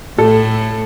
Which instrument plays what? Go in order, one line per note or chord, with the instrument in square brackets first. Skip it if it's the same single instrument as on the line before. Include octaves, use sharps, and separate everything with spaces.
[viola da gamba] A2 [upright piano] A4